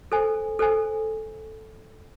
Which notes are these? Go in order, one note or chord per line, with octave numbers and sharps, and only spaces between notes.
A4 C5 G#5
A4 C5 G#5